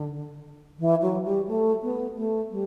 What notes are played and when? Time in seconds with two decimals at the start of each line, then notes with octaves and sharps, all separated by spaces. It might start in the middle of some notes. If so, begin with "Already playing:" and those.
Already playing: D3
0.79 E3
1.02 F#3
1.25 G3
1.47 A3
1.83 B3
2.17 A3
2.51 G3